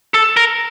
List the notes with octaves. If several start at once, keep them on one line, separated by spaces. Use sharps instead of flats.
A4
A#4